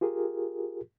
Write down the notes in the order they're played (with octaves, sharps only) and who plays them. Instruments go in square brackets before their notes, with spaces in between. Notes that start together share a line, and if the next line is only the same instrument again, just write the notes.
[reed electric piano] F4 G4 G#4 A#4